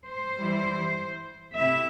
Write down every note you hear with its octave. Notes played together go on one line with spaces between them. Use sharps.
C5
E3 G3 E4
C3 A3 E4 E5